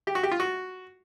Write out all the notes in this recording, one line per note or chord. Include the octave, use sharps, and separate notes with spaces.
G4
F#4
G4
F4
F#4